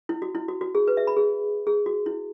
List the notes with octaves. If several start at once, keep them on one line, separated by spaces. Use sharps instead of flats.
E4
F#4
E4
F#4
F#4
G#4
B4
E5
B5
G#4
G#4
F#4
E4